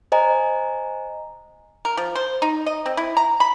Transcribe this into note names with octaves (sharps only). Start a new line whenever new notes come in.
C5 D#5 G#5 A#5
A#4
F3
C5
D#4
D#5
C4
E4
A#5
B5